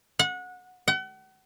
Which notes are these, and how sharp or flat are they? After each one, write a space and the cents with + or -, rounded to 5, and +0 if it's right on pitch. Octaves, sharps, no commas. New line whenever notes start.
F#5 -25
F#5 +40